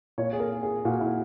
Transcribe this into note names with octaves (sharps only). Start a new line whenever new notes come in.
A#2 C#5
G#4
A#4
G#4
A#2 F#4
E4